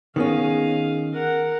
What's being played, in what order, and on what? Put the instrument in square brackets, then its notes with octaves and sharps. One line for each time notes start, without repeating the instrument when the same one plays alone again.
[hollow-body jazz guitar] D#3 B3 C#4 [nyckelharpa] G#4 F5
[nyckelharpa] A#4 F#5